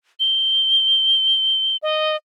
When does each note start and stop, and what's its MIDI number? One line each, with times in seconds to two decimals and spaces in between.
0.20 1.77 103
1.83 2.16 75